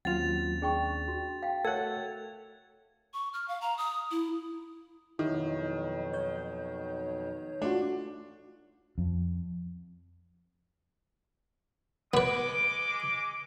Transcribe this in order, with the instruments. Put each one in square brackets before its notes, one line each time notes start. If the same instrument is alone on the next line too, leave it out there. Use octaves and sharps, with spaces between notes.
[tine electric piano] D#2 C4 C#4 [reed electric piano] F#3 F4 [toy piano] F#5 [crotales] A6 F7
[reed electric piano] D4 [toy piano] G#4 G5 C#6
[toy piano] F#4
F5 G5
[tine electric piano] A3 F#4 E5 [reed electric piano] A4 F#5 [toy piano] A#4 C#5 [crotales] G#6
[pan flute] C#6
F6
F5
A#5
D#6
E4
[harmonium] F2 B2 F#3 [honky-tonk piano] D#3 [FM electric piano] E4
[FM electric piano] C#5 G6
[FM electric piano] A3 F4 F#4 [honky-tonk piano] D4
[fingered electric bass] F2
[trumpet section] G#3 D6 [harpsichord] B3 B4